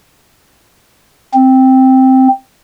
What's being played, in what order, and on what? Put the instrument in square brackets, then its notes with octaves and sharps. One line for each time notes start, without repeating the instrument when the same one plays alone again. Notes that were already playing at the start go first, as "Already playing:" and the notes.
[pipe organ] C4